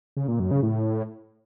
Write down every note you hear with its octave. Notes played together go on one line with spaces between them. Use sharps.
C#3
A#2
F#2
C#3
A2